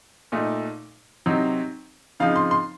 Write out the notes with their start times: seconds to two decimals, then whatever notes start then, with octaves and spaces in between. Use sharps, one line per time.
0.32 A#2 A3 D#4
1.26 C3 F#3 C4 D#4
2.20 C#3 F3 C4 D#4 F5
2.36 C6
2.51 C6